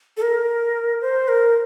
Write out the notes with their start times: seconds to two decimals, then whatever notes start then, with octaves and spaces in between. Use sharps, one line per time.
0.17 A4
0.22 A#4
1.01 C5
1.28 A#4